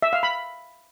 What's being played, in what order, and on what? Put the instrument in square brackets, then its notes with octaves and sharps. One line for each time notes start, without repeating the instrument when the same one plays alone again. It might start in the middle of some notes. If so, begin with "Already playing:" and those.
[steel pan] E5
F5
B5